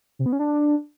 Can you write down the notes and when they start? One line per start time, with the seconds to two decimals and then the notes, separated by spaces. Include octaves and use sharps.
0.19 C3
0.26 B3
0.33 C#4
0.39 D4